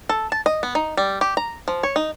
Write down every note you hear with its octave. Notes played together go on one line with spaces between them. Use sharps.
A4
A5
D#5
B3
D#4
G3
G4
A#5
F3
C#5
D#4